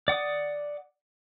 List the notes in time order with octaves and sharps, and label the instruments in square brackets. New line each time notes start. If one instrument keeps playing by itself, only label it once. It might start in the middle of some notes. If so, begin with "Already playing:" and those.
[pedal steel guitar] D5 F#5 D6 D#6